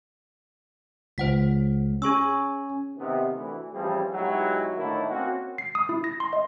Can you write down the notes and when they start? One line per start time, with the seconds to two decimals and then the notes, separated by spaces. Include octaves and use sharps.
1.18 C#2 C5 F#5 B6
2.02 C#4 G#4 G#5 C#6 E6
2.98 C3 D#3 B3
3.33 D2 E3
3.74 A1 E3 F3 G3 C4 G#4
4.14 B1 F#3 G#3 E4 F#4 G4
4.77 A2 D3 D#3 A3 A#3 E4
5.08 A#3 C4 C#4 F#4
5.58 C7
5.75 D#6
5.89 E4
6.04 A#6
6.20 C6
6.33 D#5